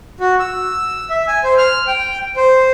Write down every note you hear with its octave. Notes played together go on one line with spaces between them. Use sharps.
F#4
E6
E5
G#5
C5
F6
G5
C5